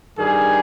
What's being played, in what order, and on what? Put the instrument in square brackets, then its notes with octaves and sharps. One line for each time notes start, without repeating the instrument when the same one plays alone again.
[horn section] G2 D#3 G3 G#4